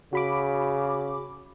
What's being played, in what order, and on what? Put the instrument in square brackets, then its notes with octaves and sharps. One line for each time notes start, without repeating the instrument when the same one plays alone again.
[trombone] C#3 [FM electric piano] F#4 B5 D6